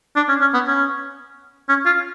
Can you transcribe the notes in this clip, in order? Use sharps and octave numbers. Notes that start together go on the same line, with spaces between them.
D4
C#4
C#4
B3
C#4
C#4
F4